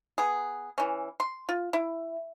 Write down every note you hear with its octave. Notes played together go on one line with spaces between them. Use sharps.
B3 G#4
E3 C#4
C6
F4
E4